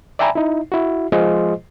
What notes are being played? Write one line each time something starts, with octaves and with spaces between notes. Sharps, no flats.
D5 E5 G5 G#5 A#5 B5
D#4 E4
E4 F#4
F3 G#3 F4 G#4 C5 D#5